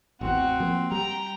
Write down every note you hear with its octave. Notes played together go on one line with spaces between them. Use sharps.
A1 E2 C4 F#4
F3 A#3
G3 G5 A#5